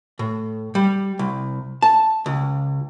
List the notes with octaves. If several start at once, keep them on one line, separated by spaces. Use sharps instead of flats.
A2
G3
C2
A5
C#2